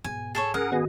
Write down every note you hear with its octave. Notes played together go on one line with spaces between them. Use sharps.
G#2 B2 G#5
G#4 A4 C#5 A6
C#4 G#4 A#4 F#5
D#3 B3 F#4 G#4 A#6